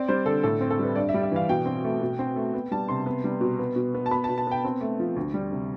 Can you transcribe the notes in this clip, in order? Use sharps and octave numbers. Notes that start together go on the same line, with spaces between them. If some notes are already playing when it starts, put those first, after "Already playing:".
Already playing: C4 D5
G3 C5
D3 A4
A2 A4
C4
A4
G3 B4
G2 D5
E5
G3
E5
E3 F5
B2 G5
C4
A3
B2
C4
A3
B3
G3 A5
C3 C6
B3
G3
B2
B3
B2
B3
A5
B3 B5
A5
B2
A5
B3 G5
C4
A3
F3
D2
G3
C3